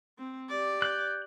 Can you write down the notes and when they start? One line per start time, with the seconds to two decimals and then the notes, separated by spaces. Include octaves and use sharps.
0.18 C4
0.49 G4 D5
0.82 F#6 G6